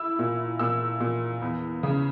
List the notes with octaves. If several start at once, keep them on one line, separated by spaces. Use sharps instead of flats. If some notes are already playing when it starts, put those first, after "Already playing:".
Already playing: E4 E6
A#2
A#2 E6
A#2
E2
C#3